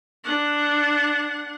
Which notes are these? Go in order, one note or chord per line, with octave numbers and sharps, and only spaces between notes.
D4 F#5